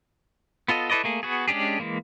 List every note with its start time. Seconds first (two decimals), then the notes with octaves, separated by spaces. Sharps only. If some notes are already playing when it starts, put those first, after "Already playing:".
0.68 B3 F4 A4 D#5
0.90 E4 A4 B4 D5 D#5
1.04 A3 A#3 G#4
1.23 B3 F#4 G#4
1.48 G#3 C#4 D4 G4 G#4
1.80 E3 G#3 A#3